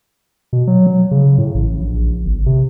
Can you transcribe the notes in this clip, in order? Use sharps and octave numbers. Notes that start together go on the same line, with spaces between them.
B2
F#3
F#3
C#3
A2
A1
A#1
G1
C3